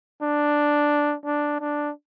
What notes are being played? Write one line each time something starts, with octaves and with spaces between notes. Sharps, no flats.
D4
D4
D4